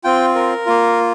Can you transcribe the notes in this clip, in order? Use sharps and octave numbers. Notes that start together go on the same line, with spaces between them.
C4 F4 G5
A#4
A#3 F4